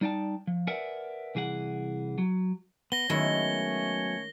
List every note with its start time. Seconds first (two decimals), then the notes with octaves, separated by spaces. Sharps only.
0.01 G3 D#4 D5 G5 A5
0.47 F3
0.67 A#4 B4 D5 E5 F#5 G#5
1.35 C2 E3 G#4 D5 F#5
2.18 F#3
2.92 B3 A#6 G7
3.10 D#3 F#3 G#3 A3 B3 C#4 E4 C#5